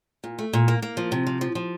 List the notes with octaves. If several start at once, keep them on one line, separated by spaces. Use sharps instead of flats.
A#2
A3
A#2
A#3
A#3
F3
C3
F3
F3
F3